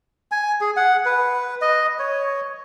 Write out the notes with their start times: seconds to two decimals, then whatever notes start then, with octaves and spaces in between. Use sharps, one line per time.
0.32 G#5
0.61 G#4
0.77 F#5
1.05 B4
1.61 D#5
1.99 C#5